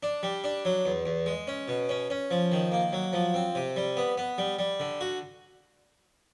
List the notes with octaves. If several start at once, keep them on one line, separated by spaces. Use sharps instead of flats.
D4
G3
D4
F#3
E2
E2
G#3
C#4
B2
C#4
C#4
F3
D#3
A#3
F#3
F3
C4
C3
G3
B3
B3
G3
G3
D3
F#4